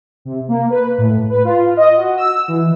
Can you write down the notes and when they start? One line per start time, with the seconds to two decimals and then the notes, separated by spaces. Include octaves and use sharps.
0.25 C3
0.49 A#3
0.70 B4
0.98 A2
1.30 B4
1.44 F4
1.77 D#5
1.97 F#4
2.17 E6
2.48 E3